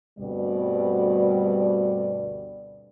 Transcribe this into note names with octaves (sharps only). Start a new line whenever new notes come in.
D2 G2 B2 G3 C4 D5